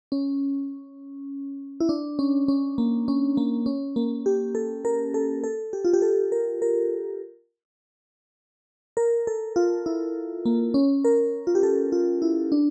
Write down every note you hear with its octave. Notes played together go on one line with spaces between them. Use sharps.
C#4
E4
D4
C#4
C#4
A#3
C#4
A#3
C#4
A#3
G4
A4
A#4
A4
A4
G4
F4
G4
A4
A#4
A#4
A#4
A4
F4
E4
A#3
C#4
A#4
F4
G4
A4
F4
E4
D4